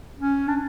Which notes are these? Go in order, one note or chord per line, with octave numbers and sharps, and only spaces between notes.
C#4
D4